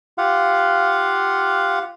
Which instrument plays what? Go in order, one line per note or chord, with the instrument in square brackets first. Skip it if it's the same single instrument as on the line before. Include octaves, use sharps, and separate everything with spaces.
[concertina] F4 G4 F5 F#5